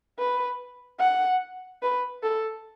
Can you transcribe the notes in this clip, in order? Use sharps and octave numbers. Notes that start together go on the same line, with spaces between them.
B4
F#5
B4
A4